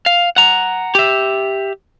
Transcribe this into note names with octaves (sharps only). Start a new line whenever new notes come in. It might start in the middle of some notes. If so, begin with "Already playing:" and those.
F5
F#5 A#5
G4 E5